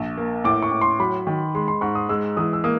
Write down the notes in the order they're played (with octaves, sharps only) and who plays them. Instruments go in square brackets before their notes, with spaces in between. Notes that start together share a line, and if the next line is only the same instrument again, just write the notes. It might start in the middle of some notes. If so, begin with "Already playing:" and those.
Already playing: [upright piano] A#1
A#3
[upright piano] A2 [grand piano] D6
[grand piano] C#6
[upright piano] A2
[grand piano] C6
[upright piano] F#3 [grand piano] B5
[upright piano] D#3
[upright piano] G#3 [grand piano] C6
[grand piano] C6
[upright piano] G#2 [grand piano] C#6
[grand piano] D#6
[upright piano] G#3 [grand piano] E6
[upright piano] E3 [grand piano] D#6
[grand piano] E6
[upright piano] A#3 [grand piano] D#6